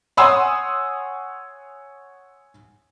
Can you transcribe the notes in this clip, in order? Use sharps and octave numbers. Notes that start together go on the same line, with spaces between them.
C#5 F#5 G#5 C6 D#6 E6